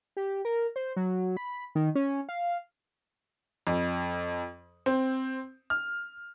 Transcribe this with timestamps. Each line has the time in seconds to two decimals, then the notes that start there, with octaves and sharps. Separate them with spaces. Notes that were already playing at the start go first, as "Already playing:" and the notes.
0.17 G4
0.45 A#4
0.76 C5
0.96 F#3
1.37 B5
1.75 D#3
1.95 C#4
2.29 F5
3.67 F2
4.86 C4
5.70 F6